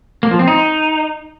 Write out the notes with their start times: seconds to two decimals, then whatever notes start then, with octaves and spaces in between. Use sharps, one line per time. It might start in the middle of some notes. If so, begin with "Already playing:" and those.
0.23 A#3
0.31 F3
0.39 C4
0.48 D#4